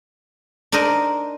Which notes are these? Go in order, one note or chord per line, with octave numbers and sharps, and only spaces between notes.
D4 D#4 A#4 C5 D#5